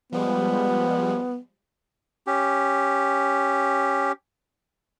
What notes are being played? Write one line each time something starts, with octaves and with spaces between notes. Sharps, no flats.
F3 G3 G#3 B3
C#4 G4